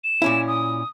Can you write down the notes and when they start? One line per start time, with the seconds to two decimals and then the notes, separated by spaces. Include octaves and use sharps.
0.04 E7
0.22 A#2 C#4 E4
0.47 D#6